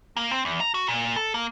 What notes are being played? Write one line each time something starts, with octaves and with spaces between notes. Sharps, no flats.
A#3
C4
E2
A#5
F#4
A#2
A4
A#3